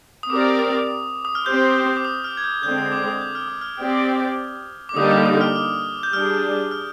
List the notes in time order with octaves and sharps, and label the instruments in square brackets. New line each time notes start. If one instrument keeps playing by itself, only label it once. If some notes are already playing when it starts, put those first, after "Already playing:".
[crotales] D#6
[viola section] C4 G4 A#4 D5 [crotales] D6
[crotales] D#6
D#6
F6
[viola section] C4 G4 C5 [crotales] G6
[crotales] D6
D#6
F6
G#6
G6
[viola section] D3 G#3 C4 [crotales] G6
[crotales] D#6
D6
D#6
G6
F6
D#6
F6
[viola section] C4 G4 D5
[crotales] D6
[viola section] D3 G3 A#3 D#4 G4 [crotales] D#6
[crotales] D6
D#6
F6
F6
G6
[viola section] G3 D4 G#4 [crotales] F6
[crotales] F6